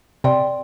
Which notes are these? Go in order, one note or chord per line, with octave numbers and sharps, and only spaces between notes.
C3 D5 G5 C6